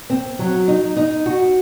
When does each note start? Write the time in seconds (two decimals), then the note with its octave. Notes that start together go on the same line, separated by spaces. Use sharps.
0.10 C4
0.39 F#3
0.68 D#4
0.97 D#4
1.26 F#4